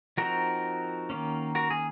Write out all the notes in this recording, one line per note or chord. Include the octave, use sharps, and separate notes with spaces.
F3 C4 D#4 F#4 A#4
D#3 A#3 C#4
F#4 A#4
G#4